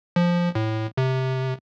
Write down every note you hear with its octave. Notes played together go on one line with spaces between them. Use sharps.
F3
A2
C3